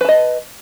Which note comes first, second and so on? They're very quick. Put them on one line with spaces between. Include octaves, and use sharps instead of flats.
B4 A5 D#5